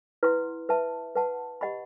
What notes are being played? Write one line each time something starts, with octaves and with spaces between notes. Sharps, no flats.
E4 B4 F#5 C6
B4 E5 A5
B4 F#5 A5
G4 D#5 F#5 B5